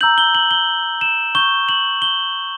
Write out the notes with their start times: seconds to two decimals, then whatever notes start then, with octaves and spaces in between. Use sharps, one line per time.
0.01 A#5 E6 G6 F#7
0.18 G7
0.35 F#7
0.51 G7
1.01 E7
1.35 C#6 G6 G7
1.69 F#7
2.02 G7